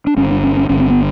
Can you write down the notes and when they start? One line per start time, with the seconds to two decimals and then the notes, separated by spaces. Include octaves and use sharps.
0.07 D4
0.17 G1 G2 D3 C#4
0.30 D4
0.44 C#4
0.57 C#4
0.69 G1 G2 D3 C#4
0.80 C4
0.90 B3